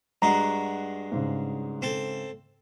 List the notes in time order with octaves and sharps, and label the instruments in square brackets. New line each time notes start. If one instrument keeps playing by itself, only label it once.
[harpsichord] G2 G#3 F#4 [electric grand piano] A#5
[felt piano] G#2 C#3
[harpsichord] C4 A4